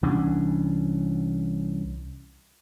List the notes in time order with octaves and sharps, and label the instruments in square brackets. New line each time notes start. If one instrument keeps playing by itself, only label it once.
[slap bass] C2 E3 C#4 D4